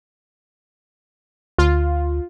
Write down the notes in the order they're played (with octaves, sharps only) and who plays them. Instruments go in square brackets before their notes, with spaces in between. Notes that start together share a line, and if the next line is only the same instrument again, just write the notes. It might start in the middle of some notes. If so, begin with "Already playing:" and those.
[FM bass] D2 [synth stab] F4